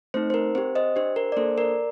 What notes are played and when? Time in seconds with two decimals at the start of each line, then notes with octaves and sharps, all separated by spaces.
0.14 A3 C4 D#4 C5
0.30 C5
0.34 A#4
0.55 C4 G4 C5
0.75 C5 D#5
0.96 D4 G4 C5
1.16 A#4
1.32 D5
1.36 A#3 D4 A4 C5
1.58 A#4 D5